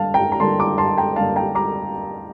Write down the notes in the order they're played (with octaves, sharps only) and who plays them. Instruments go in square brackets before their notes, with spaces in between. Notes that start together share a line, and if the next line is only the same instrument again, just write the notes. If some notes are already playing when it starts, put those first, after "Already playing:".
Already playing: [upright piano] D3 G3 A#3 D4 F5 A5
G5 A#5
A#5
D3 G3 A#3 D4 A5 C6
A#5 D6
A5 C6
G5 A#5
D3 G3 A#3 D4 F5 A5
G5 A#5
A#5 D6